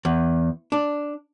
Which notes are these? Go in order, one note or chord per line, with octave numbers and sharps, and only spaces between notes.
E2
D4